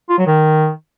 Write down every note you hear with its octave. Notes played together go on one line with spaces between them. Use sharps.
F4
F#3
D#3